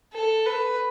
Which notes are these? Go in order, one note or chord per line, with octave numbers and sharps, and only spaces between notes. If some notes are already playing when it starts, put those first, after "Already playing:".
A4
B4